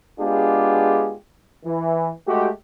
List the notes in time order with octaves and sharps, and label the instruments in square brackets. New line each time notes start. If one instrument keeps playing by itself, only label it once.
[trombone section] G#3 B3 D4 F4 G4 G#4
E3
G#3 A3 F#4 G4